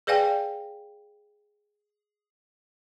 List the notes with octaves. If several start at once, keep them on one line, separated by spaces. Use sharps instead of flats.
G#4 B4 D5 F5 G5 G#5